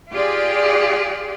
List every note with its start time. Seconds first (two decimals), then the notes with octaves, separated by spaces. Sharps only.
0.13 F4 G4 G#4 D5